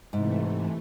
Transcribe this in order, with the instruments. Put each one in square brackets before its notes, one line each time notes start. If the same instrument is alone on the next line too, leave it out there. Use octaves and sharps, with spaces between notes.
[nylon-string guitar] G#2 [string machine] C3 E3 A3